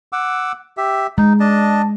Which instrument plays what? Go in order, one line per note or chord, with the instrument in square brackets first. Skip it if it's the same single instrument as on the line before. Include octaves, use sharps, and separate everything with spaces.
[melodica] F#5 D6 E6
G4 E5
[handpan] G#3 [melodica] D#4
[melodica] D4 D#5 A5